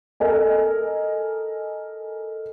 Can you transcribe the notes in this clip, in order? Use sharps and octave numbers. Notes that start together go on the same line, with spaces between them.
A4 A#4 D#5 G#5